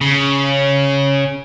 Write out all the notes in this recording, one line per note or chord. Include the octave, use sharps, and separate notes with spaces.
C#3